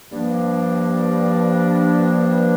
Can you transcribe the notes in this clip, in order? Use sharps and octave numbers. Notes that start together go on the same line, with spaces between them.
G2 F3 A#3 D4